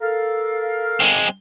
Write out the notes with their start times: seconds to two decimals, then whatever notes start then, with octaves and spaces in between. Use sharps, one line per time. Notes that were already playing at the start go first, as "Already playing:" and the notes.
0.02 A4 A#4 F5
1.00 G#3 C4